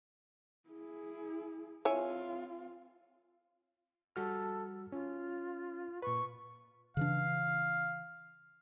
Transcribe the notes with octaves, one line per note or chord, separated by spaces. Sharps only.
E4 G#4
C4 E4 F4 C#5 G#5
G3 F#4 A4 F6
C#4 F4
A#2 B4 C#6
C#3 E3 D4 F5